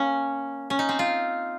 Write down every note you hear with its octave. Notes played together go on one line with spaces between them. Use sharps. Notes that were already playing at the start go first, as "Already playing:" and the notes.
Already playing: A#3 C#4
C#4
D#4
C4
F4